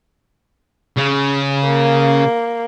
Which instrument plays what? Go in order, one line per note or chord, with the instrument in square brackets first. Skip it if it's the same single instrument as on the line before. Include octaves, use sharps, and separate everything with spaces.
[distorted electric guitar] C#3
[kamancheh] A#3